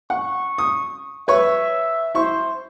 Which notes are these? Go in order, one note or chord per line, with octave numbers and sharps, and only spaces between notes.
F#5 C#6
D#6
B4 C#5 E5 C#6
E4 C5 C#6